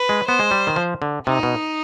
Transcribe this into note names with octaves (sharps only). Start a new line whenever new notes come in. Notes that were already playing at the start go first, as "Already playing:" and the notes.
Already playing: B4
G#3
B3 C5
G#3
G3
D#3
F3
D3
C3 D#4
B2